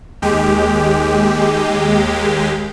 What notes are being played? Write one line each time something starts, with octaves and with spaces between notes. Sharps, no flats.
D#2 G#3 G4